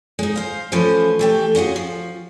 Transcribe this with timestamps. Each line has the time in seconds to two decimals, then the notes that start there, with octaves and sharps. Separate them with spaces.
0.19 G#3 D#4
0.36 C5 F5
0.72 E3 F3 A3 C#4 C5
1.19 E3 A3 G4
1.55 C#4 F4 F#4 G#4
1.76 F3